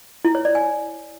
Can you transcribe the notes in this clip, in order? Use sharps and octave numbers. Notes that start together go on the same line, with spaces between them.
E4
C#5
D5
G#5